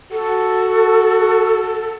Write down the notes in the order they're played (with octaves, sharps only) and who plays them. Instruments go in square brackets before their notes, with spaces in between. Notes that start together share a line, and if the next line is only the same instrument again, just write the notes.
[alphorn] F#4 [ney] A4